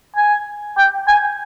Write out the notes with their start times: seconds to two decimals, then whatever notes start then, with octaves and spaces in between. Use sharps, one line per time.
0.16 G#5
0.77 G5
1.08 G#5